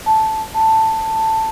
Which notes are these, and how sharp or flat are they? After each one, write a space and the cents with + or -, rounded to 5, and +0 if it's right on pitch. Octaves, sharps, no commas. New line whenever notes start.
A5 -5
A5 +10